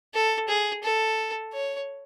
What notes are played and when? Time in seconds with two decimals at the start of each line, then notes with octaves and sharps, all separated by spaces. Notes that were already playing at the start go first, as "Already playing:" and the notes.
0.14 A4
0.48 G#4
0.83 A4
1.53 C#5